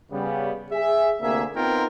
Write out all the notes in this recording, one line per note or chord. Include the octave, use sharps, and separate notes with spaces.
C#3 G3 B3
G#4 E5
D2 C3 A#3 G#4 E5
B3 C4 D#4 F4 A#4 G5